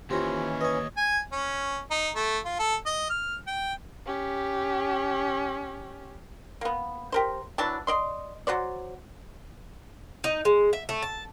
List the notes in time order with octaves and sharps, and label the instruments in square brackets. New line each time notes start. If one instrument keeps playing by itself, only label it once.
[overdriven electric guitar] D#2 [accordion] E3 C#4 [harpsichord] C4 A#5 [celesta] F4 G4
[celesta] B4 [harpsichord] C#5 D#5
[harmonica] G#5
C#4
D#4
A3
F4
A4
D#5
F6
G5
[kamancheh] C#4 G4
[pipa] A#3 B3
G4 A#4 C5
E3 F#3 D4 A5
D5 D#5 C6
F#3 F#4 C5 D5
[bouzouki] D#4
G#3
E5
A3
A5